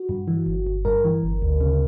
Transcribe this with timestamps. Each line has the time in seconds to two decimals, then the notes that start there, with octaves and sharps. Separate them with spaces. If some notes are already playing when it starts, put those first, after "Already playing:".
Already playing: F#4
0.09 G2
0.28 E3
0.46 G1
0.67 G1
0.85 G2 A#4
1.04 E3
1.23 G1
1.42 D2
1.61 C#3